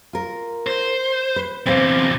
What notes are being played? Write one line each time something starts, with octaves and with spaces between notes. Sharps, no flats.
F4 A#4
C5
B4
E2 C3 C4 F5